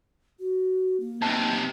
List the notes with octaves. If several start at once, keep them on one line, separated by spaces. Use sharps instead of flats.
F#4
A#3
B1 C3 A5